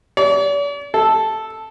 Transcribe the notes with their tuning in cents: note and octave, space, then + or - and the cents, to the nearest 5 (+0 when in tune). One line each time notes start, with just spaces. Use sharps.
D5 -45
A4 -5